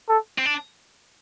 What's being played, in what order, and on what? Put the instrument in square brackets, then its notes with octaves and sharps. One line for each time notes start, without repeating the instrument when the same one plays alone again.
[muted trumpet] A4
[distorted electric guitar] C4
D4